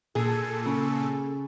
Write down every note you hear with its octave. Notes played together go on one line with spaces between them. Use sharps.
A#2 G#4 A4
C#3